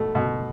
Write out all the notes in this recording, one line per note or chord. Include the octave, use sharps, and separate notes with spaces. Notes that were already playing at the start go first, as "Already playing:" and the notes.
Already playing: B2 A3
B2